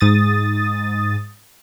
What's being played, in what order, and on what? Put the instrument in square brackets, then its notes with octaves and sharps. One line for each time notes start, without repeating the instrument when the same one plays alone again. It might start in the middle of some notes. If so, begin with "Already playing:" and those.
[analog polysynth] G#2 D#6 A6